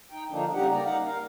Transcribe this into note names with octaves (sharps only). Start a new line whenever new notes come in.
D#4 G5
D3 F3 A#3 D4 D#4
C#3 G3 D#4 G4 F#5
A#3 D5 A#5
D#4 F5 F#5
A#4 F5